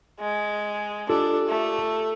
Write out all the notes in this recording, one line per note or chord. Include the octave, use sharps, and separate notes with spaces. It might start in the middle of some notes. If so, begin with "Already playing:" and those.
G#3
D4 F4 G4 A4
A3